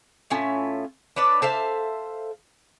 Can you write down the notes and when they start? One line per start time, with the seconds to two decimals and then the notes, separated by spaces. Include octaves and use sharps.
0.30 A2 C#4 F4 E5
1.16 D4 B4 C#5 D5
1.42 A4 C5 E5 F5